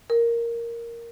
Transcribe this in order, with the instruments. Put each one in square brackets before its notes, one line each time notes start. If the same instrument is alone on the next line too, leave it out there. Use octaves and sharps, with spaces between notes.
[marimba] A#4